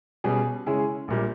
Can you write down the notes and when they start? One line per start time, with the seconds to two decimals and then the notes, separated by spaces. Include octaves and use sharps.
0.24 B2 G3 C#4 G#4
0.66 C#3 G#3 C#4 E4 G#4
1.08 A#1 A#2 G3